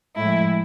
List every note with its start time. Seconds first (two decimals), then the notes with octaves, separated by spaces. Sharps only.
0.16 A2 F3 G#3 E4